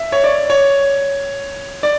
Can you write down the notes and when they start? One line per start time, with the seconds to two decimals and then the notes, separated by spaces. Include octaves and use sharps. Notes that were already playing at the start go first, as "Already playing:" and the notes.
Already playing: E5
0.12 C#5
0.24 D5
0.50 C#5
1.83 D5